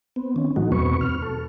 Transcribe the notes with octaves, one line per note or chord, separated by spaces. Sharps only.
B3 C4
D#3 C#4
A2 E3 F#3 A3 D#4 F#4
E2 B2 C4 B4 C#6
F6
A4